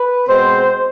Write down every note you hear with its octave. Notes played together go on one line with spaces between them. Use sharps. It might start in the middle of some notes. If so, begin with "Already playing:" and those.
Already playing: B4
B2 G#3 C4 C5